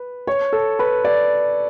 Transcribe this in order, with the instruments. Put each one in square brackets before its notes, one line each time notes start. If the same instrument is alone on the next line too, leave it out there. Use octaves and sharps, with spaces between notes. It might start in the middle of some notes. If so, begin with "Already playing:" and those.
Already playing: [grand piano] B4
C#5
A4
B4
D5